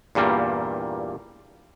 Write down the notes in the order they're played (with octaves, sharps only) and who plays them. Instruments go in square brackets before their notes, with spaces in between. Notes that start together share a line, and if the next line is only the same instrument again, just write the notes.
[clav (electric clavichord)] E2 G2 A#2 G3 A#3